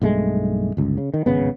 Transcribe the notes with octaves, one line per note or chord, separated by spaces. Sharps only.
B1 G2 G#3 A3
G1 C#2
C#3
D#3
D1 G#1 C#3 B3